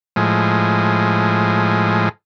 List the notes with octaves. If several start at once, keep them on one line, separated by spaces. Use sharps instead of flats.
A2 F3 G#3